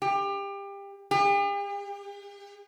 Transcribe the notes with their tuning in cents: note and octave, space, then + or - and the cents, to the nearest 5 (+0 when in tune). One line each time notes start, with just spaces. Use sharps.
G4 +25
G4 +45